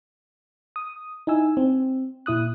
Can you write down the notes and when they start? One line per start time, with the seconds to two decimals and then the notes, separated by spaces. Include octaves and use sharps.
0.76 D#6
1.27 D#4 E4 G#5 E6
1.57 C4
2.26 A#2 E4 D#6 F#6